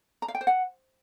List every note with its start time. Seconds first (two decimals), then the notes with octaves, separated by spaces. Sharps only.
0.22 A#5
0.28 F5
0.35 G5
0.41 C5
0.47 F#5